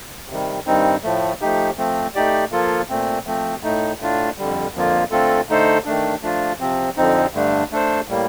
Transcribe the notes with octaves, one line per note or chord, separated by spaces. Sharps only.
C3 D#3 G3
G2 D#3 G3 C4 D#4
A2 F3 A3
F3 A3 D#4 G4
F3 A3 C4
A3 D#4 G4 D5
F3 A#3 F4 A4
A#2 A3 C4
F3 A3 C4
A2 A3 D#4
A2 A3 D4 F4
F2 D3 G3
F2 D3 F3 A#3 F4
D3 A3 C4 F4 A4
D3 A3 D#4 A4 C5
D#3 A3 D4
F3 A3 D4 F4
C3 F3 C4
F2 D3 F3 C4 D#4
G2 D3 A3 D4
A3 D4 A4 C5
A2 G3 A#3